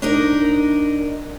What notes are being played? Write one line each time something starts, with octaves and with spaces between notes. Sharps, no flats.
D4 D#4 A#4